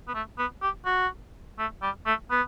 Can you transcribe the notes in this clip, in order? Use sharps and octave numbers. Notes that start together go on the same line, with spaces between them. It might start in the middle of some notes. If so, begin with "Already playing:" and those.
B3
A3
B3
G4
F#4
A3
G3
A3
B3